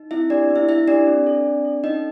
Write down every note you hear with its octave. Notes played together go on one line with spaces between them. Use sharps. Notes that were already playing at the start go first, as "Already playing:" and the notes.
Already playing: D#4
C4 E4 E5
D4 G4 D5
B3
E4 E5
E4 E5
D4 G4 D5
C4
A4
C4
A4
C#4 D#4 D#5